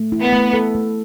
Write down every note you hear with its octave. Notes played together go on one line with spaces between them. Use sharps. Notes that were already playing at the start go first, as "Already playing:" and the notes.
Already playing: A3
E4
B3
A3
A4
A3